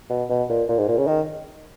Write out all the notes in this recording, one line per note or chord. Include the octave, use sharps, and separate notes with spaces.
B2
B2
A#2
A#2
G#2
A#2
C#3
D#3